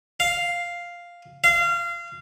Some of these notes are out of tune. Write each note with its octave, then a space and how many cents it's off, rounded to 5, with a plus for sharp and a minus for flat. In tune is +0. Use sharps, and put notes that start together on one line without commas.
F5 +0
F5 -25